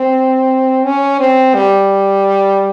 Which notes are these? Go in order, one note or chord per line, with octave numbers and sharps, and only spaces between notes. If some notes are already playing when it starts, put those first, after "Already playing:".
Already playing: C4
C#4
C4
G3